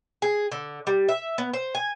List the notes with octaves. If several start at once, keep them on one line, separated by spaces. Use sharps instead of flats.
G#4
D3
G3
E5
B3
C5
G#5